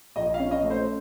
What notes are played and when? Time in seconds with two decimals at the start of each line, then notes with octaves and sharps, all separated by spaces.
0.16 A#1 D#5
0.34 F5
0.40 C#4
0.51 D#5
0.64 A3
0.70 C5